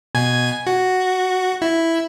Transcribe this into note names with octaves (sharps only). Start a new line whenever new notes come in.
B2 G#5 G#6
F#4
E4